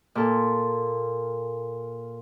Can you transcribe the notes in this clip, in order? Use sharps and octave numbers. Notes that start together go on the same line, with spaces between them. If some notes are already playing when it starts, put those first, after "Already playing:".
A#2 A4